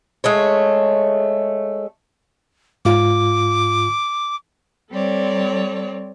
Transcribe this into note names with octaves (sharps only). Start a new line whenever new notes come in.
G#3 A3 C#5
G#2 F4 D6
G3 C4 A4 C#5 D5